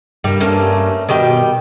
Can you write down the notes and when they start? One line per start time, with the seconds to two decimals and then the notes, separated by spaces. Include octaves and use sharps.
0.24 G2 G3 A#3
0.40 A3 A#3 C#4
1.09 B2 D#3 G3 G5